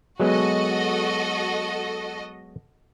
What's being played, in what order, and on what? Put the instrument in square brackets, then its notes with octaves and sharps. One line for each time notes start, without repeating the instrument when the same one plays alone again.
[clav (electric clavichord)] F#3 G#3 B3 [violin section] F#4 A4 D#5